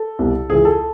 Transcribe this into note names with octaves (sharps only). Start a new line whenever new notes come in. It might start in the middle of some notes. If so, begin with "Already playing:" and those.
Already playing: A4
C2 B2 G3
C#2 C#3 E3 G#4
A4